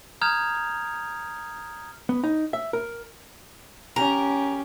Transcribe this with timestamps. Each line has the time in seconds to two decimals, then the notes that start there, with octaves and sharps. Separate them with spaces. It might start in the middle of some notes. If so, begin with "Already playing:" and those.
0.21 A#5 D#6 F6 G6 G#6 F7
2.09 B3
2.24 D#4
2.53 E5
2.73 A#4
3.96 C#4 G4 A#4